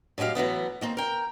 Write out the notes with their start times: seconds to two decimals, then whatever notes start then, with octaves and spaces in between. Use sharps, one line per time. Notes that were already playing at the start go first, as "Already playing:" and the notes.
0.18 A2 F#3 G#3 G4 F5
0.35 E3 F#3 A3 B3
0.81 D#3 A#3 C4
0.97 A#4 G5